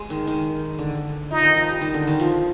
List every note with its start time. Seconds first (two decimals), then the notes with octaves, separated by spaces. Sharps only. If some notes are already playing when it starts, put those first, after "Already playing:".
Already playing: G#3
0.10 D#3
0.27 D#3
0.79 D3
1.30 F3 D#4
1.43 D#3
1.56 F3
1.68 G3
1.81 D#3
1.94 D3
2.07 D#3
2.20 F3